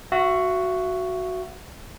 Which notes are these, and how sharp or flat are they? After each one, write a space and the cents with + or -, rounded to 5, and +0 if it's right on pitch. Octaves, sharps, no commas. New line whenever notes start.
F#4 +0 E5 +40